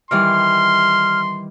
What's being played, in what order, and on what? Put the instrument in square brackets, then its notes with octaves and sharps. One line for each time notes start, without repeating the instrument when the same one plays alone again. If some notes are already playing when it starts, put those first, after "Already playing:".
[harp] D#3 E3 G3 [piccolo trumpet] C6 [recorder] F6